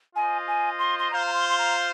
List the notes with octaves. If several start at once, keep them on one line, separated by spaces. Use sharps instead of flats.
F4 C5 D#5 G#5
G#5
C6
C6
F4 C5 F5 A#5
A#5
C6
C6
A#5